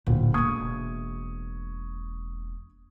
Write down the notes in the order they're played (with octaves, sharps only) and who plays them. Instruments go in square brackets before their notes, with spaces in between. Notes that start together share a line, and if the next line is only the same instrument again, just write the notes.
[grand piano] D1 [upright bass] A#2
[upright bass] E1 A#3 [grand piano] C#6 D#6 G#6